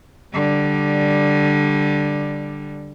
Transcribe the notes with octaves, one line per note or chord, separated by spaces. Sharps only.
D3 G3